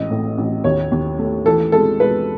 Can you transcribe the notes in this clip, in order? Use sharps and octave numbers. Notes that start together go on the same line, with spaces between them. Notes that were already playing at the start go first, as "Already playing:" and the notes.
Already playing: A1 G#3 D#5
A2
A1
D#2 C#5
D#2
A3
E3 A4
G#3 A4
G#3 B4